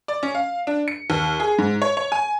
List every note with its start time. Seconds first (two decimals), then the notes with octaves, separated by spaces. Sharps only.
0.08 D5
0.23 C#4
0.35 F5
0.67 D4
0.88 C#7
1.10 D#2
1.40 G#4
1.59 G#2
1.82 C#5
1.97 C#5
2.12 G#5